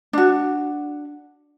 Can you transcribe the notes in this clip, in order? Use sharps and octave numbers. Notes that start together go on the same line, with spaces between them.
D4 F#4